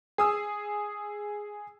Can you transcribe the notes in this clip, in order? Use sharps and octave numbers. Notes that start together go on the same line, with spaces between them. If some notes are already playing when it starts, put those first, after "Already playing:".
G#4 D#6 E6